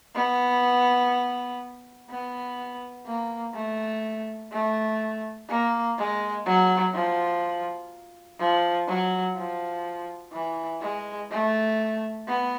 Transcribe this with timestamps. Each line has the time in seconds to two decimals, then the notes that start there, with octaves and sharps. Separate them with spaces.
0.15 B3
2.10 B3
3.06 A#3
3.55 A3
4.52 A3
5.49 A#3
5.98 G#3
6.46 F#3
6.94 F3
8.40 F3
8.88 F#3
9.36 F3
10.33 E3
10.81 G#3
11.31 A3
12.28 B3